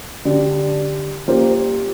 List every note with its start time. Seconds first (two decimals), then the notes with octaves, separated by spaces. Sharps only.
0.25 D3 G3 D4
1.28 G3 A#3 F4 C5